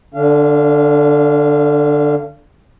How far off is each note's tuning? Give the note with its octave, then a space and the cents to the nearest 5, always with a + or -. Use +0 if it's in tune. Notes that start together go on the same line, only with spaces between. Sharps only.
D3 +10 D4 -35 F5 -25